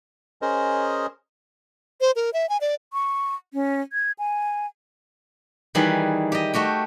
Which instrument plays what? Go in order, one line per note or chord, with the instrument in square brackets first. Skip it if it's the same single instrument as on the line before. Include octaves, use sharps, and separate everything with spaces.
[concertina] C#4 G#4 A#4 C5 D#5
[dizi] C5
A#4
E5
G#5
D5
[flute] C#6
C#4
G#6
G#5
[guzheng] D#3 E3 G3 G#4 B4
G4 D#5
A3 F#4 G4 G5